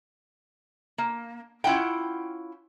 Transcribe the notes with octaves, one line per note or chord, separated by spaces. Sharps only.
A#3
C#4 E4 F4 F#5 G5